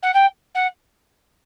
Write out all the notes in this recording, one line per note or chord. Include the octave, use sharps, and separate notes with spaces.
F#5
G5
F#5